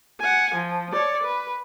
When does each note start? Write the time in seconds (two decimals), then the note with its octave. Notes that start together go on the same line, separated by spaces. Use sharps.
0.20 F#5 G#5
0.55 F3
0.93 C#5 D5
1.23 B4